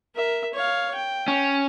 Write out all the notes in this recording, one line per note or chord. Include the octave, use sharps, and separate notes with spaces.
A#4 E5
C#5 F5
G5
C#4